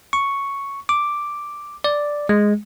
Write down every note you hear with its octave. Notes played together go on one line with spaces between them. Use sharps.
C#6
D6
D5
G#3